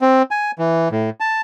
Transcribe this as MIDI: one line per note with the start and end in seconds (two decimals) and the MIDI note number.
0.01 0.22 60
0.31 0.51 80
0.59 0.89 52
0.92 1.10 45
1.20 1.41 81